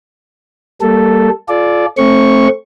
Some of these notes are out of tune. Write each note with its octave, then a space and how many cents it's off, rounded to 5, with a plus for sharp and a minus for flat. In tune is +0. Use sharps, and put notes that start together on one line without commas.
G3 +0 A#3 -15 A4 +0
F4 +0 A4 -40 D5 +0
A3 +0 C4 +25 C#6 +0